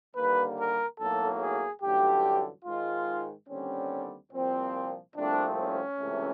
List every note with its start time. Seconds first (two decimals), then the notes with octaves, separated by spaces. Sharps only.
0.15 D#2 D3 G3 A#3 B4
0.58 A#4
0.99 B1 A2 F#3 A#3 A4
1.41 G#4
1.82 A1 G2 D3 F#3 A3 G4
2.65 G#2 D#3 G#3 F4
3.48 D#2 D3 G3 C4 C#4
4.32 C2 A#2 F3 C4
5.15 C2 A#2 F3 A3 C4 D4
5.58 C#4
5.98 C#2 C3 E3 A3